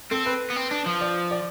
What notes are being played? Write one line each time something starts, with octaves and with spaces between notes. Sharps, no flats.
C4 A4
B4
B3
C4
D4
F3
D5
D5